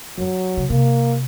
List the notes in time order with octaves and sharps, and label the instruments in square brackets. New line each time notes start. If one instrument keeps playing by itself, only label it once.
[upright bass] F#2 [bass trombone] F#3
[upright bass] C#3
[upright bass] C3 [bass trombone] A#3